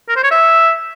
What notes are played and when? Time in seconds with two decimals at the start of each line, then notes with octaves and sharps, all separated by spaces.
0.09 A#4
0.16 C5
0.24 C#5
0.31 E5